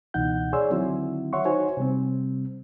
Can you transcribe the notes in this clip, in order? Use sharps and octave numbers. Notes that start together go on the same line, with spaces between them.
C#2 B2 E3 D#4 F#5 G6
G#4 C#5 D5 G#5 C6 E6
D3 D#3 F#3 C4 E4 F#4
C#5 E5 F#5 C6 C#6
D#4 F#4 C5 C#5 G#5
C3 G3 C4